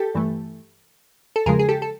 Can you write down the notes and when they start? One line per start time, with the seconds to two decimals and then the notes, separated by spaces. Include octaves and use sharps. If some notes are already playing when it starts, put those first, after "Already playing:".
Already playing: G4 A4
0.15 G2 E3 A3
1.36 A4
1.46 E2 C#3 F3 G#3 G#4 A#4
1.59 G#4
1.69 G4 A4
1.82 A4